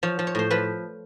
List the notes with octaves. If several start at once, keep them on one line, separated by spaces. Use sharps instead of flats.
F3 C#5
F3
C#5
A2 C5
F3 B4